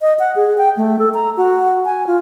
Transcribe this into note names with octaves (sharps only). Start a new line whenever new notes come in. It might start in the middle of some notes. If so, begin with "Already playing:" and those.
D#5
F#5
G#4
G5
A3
A4
A#5
F#4
G#5
F4